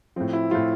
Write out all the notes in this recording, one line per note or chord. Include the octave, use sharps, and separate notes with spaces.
A2 F3 C4
E4
A2 F3 F4